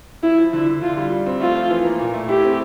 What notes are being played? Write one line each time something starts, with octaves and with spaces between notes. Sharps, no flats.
F3 E4
F3
D3 E4
D3
D3 F4
G3
G3
C4
A3 F4
F3
E3
A#3
A#2
A3
E4 G4
C4